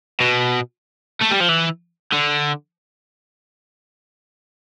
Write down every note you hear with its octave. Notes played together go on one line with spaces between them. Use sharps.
B2
A3
G3
F3
E3
D3